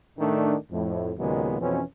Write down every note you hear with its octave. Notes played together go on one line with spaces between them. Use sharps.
A2 D#3 A3 D4
F2 A2
D#2 A#2 C#3 F#3 G#3 B3
F2 B2 E3 C4 C#4